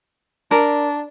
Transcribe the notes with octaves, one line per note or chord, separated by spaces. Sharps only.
D4 A#4